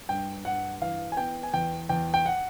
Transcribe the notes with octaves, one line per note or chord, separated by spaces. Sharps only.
G2 G5
G2 F#5
E3 F5
G#5
B3 G5
G#5
E2 G5
E2 G5
G5
F#5